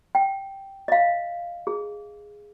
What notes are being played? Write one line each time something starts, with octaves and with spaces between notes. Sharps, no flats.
G5
D#5 F5
G#4